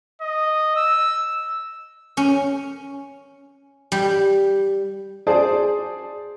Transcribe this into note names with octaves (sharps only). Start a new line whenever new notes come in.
D#5
E6
C#4
G3
G#4 C5 D5 A5